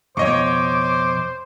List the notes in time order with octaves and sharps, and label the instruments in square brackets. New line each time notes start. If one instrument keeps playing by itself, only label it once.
[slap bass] F2 B2 [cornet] C5 [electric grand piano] C#5 D#5 C#6 [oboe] D6